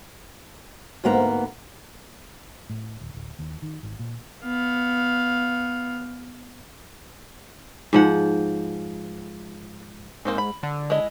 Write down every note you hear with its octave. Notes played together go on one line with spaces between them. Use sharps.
D2 G#2 A#3 B3 A#5
A2
D1
D1
D#2
D#3
G#1
A#2
B3 F5
G#2 F3 F#5
G#2 A#3 C4 D#4
B5
D3
G#3 E4 D#5